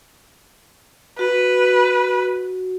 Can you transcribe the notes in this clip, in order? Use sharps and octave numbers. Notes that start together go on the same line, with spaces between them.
F#4 B4